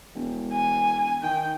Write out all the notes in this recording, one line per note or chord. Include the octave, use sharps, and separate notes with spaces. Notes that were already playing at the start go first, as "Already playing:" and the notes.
E1
G#5
D#3 G5